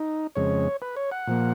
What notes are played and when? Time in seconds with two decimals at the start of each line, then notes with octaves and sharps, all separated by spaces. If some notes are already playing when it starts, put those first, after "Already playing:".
Already playing: D#4
0.35 F2 C#3 G#3 C#5
0.82 B4
0.96 C#5
1.11 F#5
1.27 A#2 F3 A#3